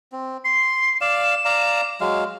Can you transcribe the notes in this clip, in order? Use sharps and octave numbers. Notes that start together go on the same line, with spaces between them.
C4
C6 C7
D5 F5 E7
D5 F5 A#5
F#3 G#3 F5